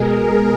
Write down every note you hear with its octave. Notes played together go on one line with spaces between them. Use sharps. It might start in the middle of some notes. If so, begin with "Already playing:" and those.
Already playing: B2 G#3 G#4 A#4